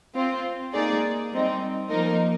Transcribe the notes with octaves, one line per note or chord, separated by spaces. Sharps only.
C4 F4 C5
A#3 D#4 G#4 D5
G3 C4 D#4
F3 A#3 D#4 A#4